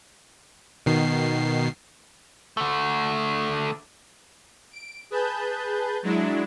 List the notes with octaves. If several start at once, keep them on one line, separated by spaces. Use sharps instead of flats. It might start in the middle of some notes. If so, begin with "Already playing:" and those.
B2 D#3 C7
D3 A3
D7
G#4 B4 A5 G6
F#3 G#3 D4 E4